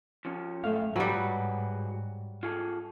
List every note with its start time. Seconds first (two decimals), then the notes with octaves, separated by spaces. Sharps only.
0.25 F3 C#4
0.64 F#2 A3 F5
0.96 G#2 F#3 G3 F#4 G#4 B4
2.43 F4 G#4 A4